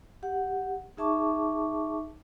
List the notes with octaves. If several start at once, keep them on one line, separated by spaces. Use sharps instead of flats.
G4 F#5
D#4 G#4 E5 A5 C#6 D6